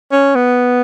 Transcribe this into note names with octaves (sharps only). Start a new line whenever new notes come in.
C#4
B3